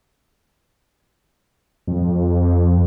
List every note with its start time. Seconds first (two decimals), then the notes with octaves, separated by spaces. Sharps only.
1.88 F2